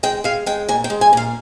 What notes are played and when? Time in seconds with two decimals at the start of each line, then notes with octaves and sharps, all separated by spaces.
0.03 G#3 G5
0.24 G#3 F5
0.46 G#3 G5
0.68 A#2 G#5
0.84 G5
0.90 G#3
1.01 G#5
1.13 A#2 F5